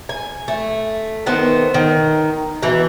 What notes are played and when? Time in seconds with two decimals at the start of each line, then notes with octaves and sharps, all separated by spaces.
0.09 G#5
0.48 A3
1.26 D#3 A3 B3 C5
1.74 D#3
2.63 B2 E3